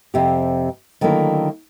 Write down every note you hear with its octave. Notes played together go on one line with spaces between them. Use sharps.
F2 C3 G4
D3 D#3 F#3 A3 A#3 E4